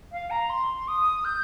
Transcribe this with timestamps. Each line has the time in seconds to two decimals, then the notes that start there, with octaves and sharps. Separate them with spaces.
0.12 F5
0.30 A#5
0.49 C6
0.88 D#6
1.25 G6